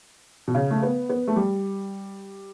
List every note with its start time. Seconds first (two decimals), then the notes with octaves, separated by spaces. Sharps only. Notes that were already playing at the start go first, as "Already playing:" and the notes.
0.48 B2
0.55 C#3
0.70 A3
0.83 B3
1.09 B3
1.27 A3
1.36 G3